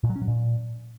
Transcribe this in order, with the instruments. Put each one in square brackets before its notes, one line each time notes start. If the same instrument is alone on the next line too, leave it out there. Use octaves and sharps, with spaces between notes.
[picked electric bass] A#2
F#3
C#4
F#3
A#2